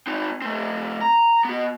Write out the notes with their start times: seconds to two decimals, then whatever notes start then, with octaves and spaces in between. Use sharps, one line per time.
0.07 C4 D#4
0.42 A3 C4
1.01 A#5
1.45 B3 F#4